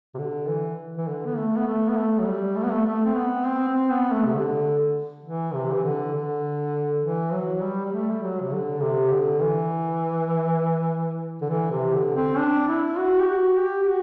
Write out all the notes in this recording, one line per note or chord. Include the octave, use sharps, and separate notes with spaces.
C3
D3
E3
E3
D3
B3
A3
B3
A3
B3
A3
F#3
G3
A3
B3
A3
A3
C4
B3
C4
C4
B3
A3
C3
D3
E3
C3
E3
D3
D3
E3
F#3
G3
G3
A3
G3
F#3
C3
D3
C3
D3
E3
D3
E3
C3
D3
C4
D4
E4
F#4
G4
F#4
G4
G4
F#4